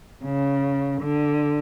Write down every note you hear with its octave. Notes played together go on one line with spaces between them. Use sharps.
C#3
D3